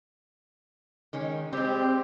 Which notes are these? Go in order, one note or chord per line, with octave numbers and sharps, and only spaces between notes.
D#3 G#3 C#4
G3 G#3 C4 G4